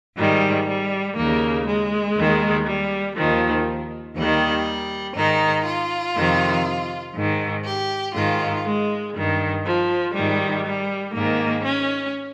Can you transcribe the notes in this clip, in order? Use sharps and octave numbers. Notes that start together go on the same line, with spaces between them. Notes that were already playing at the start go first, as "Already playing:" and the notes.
G#2 D#3 G3
G3
D#2 C#3 A#3
G#3
D#2 D#3
G3
D#2 D#3 F3
D#2 D#3 G3
G#2 D#3 D#4
F4
F2 C3 D#3
G#2 D#3
G4
G#2 D#3 F4
G#3
G2 D#3
F3
G#2 D#3 G3
G3
G#2 D#3 A#3
C#4